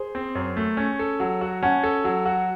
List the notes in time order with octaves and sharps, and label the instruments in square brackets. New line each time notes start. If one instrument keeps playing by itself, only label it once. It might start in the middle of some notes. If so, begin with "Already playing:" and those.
Already playing: [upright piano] G#4 C5
[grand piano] C4
F#2
A3
C#4
A4
F#3
F#4
[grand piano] C#4 [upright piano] F#5 A5
[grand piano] A4
F#3
F#4